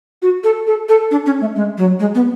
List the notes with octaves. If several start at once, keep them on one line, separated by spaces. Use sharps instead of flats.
F#4
A4
A4
A4
D4
C#4
A3
G#3
F#3
G#3
B3